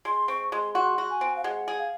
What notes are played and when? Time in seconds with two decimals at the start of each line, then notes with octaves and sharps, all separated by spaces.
0.05 G#3 C6
0.28 C4 C#6
0.52 G#3 C6
0.75 F#4 C6
0.98 F#4
1.10 G#5
1.21 C4
1.36 F5
1.44 G#3 F#5
1.68 G#4 F#5
1.79 F5